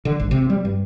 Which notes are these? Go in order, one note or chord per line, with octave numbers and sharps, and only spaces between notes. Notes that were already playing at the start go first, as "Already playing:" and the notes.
D3
G#1
C3
G3
G2